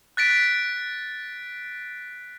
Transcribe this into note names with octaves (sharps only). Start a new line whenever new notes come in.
F#6 A6 B6 D7